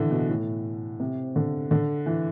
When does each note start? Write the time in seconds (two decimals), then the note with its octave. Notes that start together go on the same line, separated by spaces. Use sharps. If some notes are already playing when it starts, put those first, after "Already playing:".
Already playing: D3 E3
0.11 B2
0.29 A2
1.00 C3
1.36 D3
1.71 D3
2.06 E3